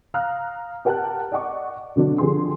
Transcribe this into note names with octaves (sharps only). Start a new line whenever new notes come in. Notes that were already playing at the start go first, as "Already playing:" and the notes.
F5 A#5 D#6 F6 F#6
G4 A#4 F#5 G5 A5 F#6
D5 D#5 F#5 C#6 D6
B2 D3 F#3 D4
D3 F3 G4 G#4 C6